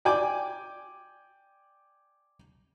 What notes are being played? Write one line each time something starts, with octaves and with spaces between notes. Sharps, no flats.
D5 G5 G#5 D6